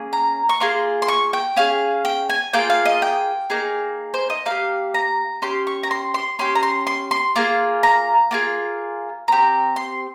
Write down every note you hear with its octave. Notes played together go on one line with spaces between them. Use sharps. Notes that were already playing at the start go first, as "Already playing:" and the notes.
Already playing: A#3 C#4 G#4
A#5
C#6
A#3 F4 G#4 C6
C6
C#6
G5
C#4 G#4 F5
G5
G#5
A#3 F4 G#4 G5
F5
D#5
G5
A#3 D#4 G#4
C5
D#5
A#3 D#4 G4 F5
A#5
C#4 G4 C6
C#6
A#5
C6
C6
C#4 G4 C6
A#5
C6
C6
C6
A#3 F4 G#4
A#5
A#3 F4 G#4
C4 G4 A#5
C6